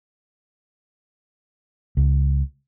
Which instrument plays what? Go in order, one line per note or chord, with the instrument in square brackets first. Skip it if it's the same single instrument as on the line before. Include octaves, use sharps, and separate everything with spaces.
[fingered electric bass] C#2